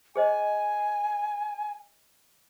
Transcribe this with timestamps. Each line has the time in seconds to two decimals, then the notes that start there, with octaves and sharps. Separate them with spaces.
0.16 G#4 C5 D#5 G#5